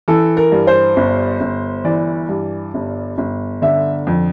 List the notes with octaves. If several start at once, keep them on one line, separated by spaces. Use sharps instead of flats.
E3 A4
A#4
G2
C5
G1
G1
E3 D5
G2
G1
G1
D3 E5
F2